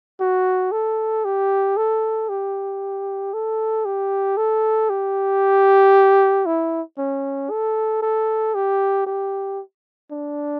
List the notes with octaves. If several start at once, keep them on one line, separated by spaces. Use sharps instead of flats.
F#4
A4
G4
A4
G4
A4
G4
A4
G4
E4
C#4
A4
A4
G4
G4
D4